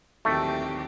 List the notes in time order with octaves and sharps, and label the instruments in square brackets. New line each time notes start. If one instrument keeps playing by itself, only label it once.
[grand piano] D1 A#1 D#2 [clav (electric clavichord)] A3 [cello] C4 G4 [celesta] C#6